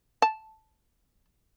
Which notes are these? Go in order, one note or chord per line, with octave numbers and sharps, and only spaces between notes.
A5